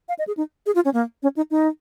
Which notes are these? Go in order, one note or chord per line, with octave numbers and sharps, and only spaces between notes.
F5
D#5
G#4
D#4
G#4
F4
C#4
A#3
C#4
D#4
D#4